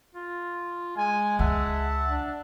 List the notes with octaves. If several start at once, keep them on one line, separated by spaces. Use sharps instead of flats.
F4
G#3 G#5
C#2 E5 F#5 A5
D4